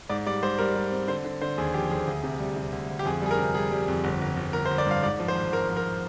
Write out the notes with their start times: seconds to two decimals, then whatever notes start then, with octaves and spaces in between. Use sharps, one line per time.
0.09 G#2 D5
0.27 G3 D5
0.43 G#2 C5
0.58 G3 A#4
0.76 G3
0.92 C4
1.08 D3 C5
1.25 D3
1.42 D3 C5
1.58 D#2 G#4
1.74 F3 G4
1.90 D#2 G#4
2.07 D2
2.23 C3
2.40 G3
2.56 C3
2.72 D2
2.89 D2
2.99 G4
3.05 F2 G#4
3.22 G3 G#4
3.31 A#4
3.39 C3
3.55 G3 G#4
3.72 G3
3.88 F2
4.04 G1
4.21 G1
4.37 G1
4.53 G1 A#4
4.66 C5
4.71 G1
4.78 D5
4.87 G2 F5
5.03 G#2 D5
5.20 F3
5.28 C5
5.35 G#1
5.52 G#1 A#4
5.69 F3
5.77 A#4